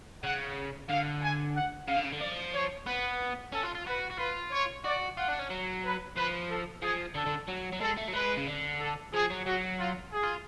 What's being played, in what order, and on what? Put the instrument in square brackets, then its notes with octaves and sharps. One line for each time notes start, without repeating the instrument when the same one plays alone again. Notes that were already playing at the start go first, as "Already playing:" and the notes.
[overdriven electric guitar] C#3 [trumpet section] F#5
[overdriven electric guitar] D3 [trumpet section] F5
[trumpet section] G#5
F#5
[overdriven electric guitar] C#3 [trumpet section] F5
[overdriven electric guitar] D3
C#3
D3
[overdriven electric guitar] F3 [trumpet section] D5
[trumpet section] C#5
[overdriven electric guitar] B3 [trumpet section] B4
[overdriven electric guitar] C#4 [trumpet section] A4
[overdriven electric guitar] F4
F4
[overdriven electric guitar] F#4 [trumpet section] B4
[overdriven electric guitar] F#4
[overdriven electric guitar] F4 [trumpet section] B4
[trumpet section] C#5
[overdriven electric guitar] F#4 [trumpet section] D5
[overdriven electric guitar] F4 [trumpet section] F#5
[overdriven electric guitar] D4
C#4
F#3
[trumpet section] B4
[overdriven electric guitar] F3 [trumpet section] B4
[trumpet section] A4
[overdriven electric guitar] F3 [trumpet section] G#4
[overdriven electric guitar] D3 [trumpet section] A4
[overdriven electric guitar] D3
F#3
F#3
[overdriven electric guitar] G#3 [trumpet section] A4
[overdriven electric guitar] A3
F#3
[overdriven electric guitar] G#3 [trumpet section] B4
[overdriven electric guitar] C#3
D3
[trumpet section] A4
[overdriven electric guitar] F3 [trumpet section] G#4
[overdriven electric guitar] F#3
[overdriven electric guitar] F#3 [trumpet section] F#4
[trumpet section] F4
G#4
[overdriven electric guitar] F4